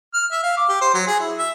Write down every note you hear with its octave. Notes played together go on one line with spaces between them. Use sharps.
F6
E5
F5
D6
G4
C5
F#3
G#4
E4
E5